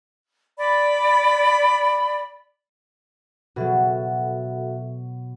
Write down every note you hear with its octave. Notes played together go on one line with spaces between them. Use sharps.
D5 B5
B2 F#3 F#4 A4 E5